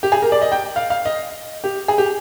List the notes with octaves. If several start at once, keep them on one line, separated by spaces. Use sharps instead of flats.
G4
G#4
A#4
D5
D#5
G5
F5
F5
D#5
G4
G#4
G4